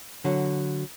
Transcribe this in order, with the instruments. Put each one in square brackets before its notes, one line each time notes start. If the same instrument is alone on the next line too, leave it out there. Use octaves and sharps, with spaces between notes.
[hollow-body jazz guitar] D3 F#3